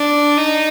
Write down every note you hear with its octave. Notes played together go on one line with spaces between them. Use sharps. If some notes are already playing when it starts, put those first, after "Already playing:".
Already playing: D4
D#4